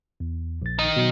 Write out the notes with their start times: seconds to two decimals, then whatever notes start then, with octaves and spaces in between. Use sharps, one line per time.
0.20 E2
0.62 A#1 A6
0.79 D#3 D#5
0.96 B2 F#3